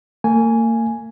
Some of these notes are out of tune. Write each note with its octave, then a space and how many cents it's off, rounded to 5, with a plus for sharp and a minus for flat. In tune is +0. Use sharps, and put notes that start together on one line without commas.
A#3 -40 G#5 +0